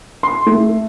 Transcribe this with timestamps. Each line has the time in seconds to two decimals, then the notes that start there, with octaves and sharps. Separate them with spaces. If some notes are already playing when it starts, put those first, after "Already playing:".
0.23 C6
0.46 A3